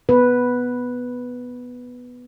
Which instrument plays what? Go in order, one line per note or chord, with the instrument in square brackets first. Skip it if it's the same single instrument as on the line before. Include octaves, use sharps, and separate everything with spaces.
[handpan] B3 B4